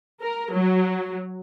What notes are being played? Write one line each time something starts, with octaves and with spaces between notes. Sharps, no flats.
A#4
F#3